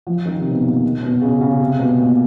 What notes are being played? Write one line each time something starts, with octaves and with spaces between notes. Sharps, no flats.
F3
D#3
C3
B2
A#2
B2
C#3
C#3
C3
B2
A#2